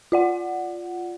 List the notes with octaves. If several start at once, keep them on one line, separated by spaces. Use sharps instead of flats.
F4 D5 F#5